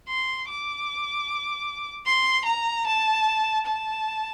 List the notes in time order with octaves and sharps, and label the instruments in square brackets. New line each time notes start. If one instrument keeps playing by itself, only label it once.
[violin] C6
D6
C6
A#5
A5
A5